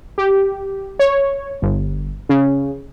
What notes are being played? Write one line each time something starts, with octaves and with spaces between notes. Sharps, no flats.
G4
C#5
G1
C#3